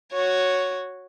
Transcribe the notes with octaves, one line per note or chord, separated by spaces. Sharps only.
F#4 C#5